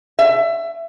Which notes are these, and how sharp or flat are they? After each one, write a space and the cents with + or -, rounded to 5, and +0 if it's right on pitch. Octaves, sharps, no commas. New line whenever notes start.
E5 +20